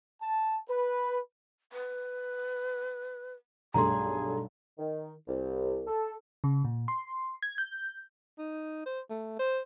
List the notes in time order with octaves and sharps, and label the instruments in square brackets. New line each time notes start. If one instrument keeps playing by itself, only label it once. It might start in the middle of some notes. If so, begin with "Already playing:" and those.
[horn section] A5
B4
[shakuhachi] B4
[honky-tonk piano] B1 G2 A3 [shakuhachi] G#4 [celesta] A#5 C6
[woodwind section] D#3
C2
A4
[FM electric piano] C#3
A#2
C6
G#6
G6
[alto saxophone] D#4
C5
A3
C5